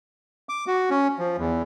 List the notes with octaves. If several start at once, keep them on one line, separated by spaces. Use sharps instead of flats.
D6
F#4
C#4
F3
E2